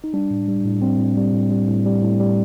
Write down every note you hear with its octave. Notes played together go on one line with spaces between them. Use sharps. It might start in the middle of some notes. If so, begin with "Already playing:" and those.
D#4
G3 D4
A2
G3
A2
G3 C4
A2
G3
A2
G3
A2
G3
A2
G3